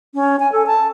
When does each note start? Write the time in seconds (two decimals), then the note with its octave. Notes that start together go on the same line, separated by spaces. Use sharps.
0.14 C#4
0.40 G#5
0.52 A4
0.66 A5